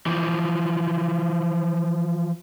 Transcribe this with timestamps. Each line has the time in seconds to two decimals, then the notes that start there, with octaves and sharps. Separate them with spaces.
0.06 E3 F3